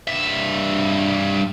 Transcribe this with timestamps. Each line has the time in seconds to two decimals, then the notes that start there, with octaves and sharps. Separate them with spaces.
0.07 G2 E5